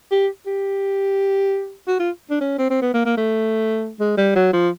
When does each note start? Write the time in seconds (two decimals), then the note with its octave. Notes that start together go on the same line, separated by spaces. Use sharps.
0.12 G4
0.47 G4
1.88 F#4
1.99 F4
2.30 D4
2.41 C#4
2.59 C4
2.71 C4
2.82 B3
2.94 A#3
3.06 A#3
3.17 A3
4.00 G#3
4.18 G3
4.36 F#3
4.53 F3